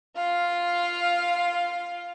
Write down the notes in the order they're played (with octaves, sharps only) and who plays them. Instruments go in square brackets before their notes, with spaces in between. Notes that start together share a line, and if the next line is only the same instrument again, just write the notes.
[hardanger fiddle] F4 F5